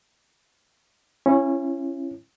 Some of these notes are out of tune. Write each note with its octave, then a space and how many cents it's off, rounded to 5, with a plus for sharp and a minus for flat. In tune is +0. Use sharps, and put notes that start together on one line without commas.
C#4 -15 E4 +35